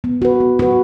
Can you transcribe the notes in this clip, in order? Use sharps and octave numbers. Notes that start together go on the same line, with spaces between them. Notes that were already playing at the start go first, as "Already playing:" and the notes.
B3
F#4 B4
B3
F#4 B4